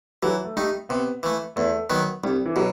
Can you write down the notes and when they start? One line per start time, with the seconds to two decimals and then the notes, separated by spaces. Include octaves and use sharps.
0.23 E3 F#3
0.45 A3
0.57 G3 A3 D#4
0.89 C3 B3
1.23 E3 A3
1.56 E2 A3
1.90 D#3 F#3 B3
2.23 C2 G3
2.46 E3
2.56 B2 F#3